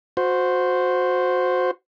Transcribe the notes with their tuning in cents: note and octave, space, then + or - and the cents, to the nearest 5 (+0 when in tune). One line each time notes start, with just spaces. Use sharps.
F#4 -25 C5 -10